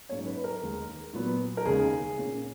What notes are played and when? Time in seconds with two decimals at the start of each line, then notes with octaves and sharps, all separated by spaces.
0.09 G#2 F#3 A#3 C#4 C#5
0.27 B4
0.44 A#4
0.62 D#2 D#3 G#3
1.13 A#2 F#3 B3
1.57 A#4
1.65 D#2 C#3 G#3 C#4 G#4
2.18 A#2 A#3 C#4